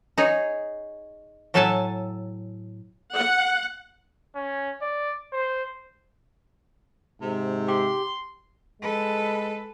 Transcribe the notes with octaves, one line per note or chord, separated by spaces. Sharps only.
D#4 G#4 C#5
A2 F#3 A4 E5 G#5 A5
F#5
C#4
D5
C5
G#2 C3
G4 C6
G#3 A4 B4